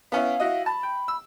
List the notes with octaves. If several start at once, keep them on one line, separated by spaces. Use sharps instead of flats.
B3 C#4 E4 F5
E4 F#4 D#5
A5 B5
G5
E6